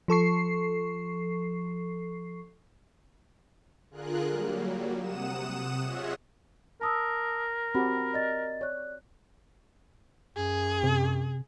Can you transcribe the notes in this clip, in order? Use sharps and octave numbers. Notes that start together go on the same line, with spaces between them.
F3 A4 C#6 C7
D3 F4 G#4 A#4 F#6
F#3 G3 A#3
C3 F#5 D#6 E7
F4 G#4 C#5 D#5 E5 F#5
A#4 A5 D#6 E6
C4 F#4 G4 B5
D5 D#5 A6
C#5 D5 F#6
F#2 G#4
C3